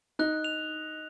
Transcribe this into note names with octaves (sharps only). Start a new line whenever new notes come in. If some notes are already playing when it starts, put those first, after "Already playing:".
D#4 F#6
F7